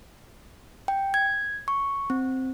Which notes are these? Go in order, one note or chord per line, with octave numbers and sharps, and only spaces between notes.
G5
G#6
C#6
C4